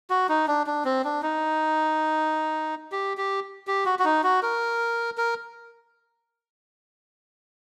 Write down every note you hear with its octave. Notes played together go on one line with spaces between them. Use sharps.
F#4
D#4
D4
D4
C4
D4
D#4
G4
G4
G4
F#4
F#4
D#4
F#4
A#4
A#4